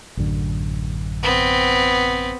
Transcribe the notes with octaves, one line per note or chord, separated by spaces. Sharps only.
A1 F#2 D3
B3 C4